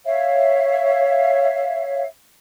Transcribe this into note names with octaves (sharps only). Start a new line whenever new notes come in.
C#5 E5 F5